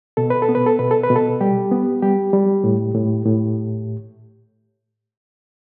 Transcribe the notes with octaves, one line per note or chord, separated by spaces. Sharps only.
B2 A4
B4
A4
B3
B4
A4
B2 B4
A4
B4
B2
A4
G3 G4
B3
G3 G4
G3
A2
A2
A2